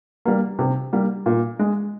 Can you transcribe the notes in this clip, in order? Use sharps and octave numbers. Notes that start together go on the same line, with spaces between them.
G3 A#3
C3
G3 A#3
A#2
G#3